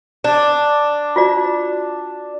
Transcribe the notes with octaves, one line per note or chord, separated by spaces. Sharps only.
D4 D5
F4 F#4 D5